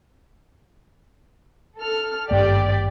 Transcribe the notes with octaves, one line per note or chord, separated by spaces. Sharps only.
A4 F6
G#1 G2 A#3 G4 D5